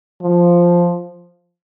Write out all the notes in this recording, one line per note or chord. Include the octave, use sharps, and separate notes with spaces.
F3